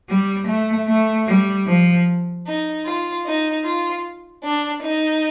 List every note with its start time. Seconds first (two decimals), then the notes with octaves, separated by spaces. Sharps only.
0.09 G3
0.48 A3
0.88 A3
1.27 G3
1.67 F3
2.45 D#4
2.85 F4
3.25 D#4
3.64 F4
4.43 D4
4.82 D#4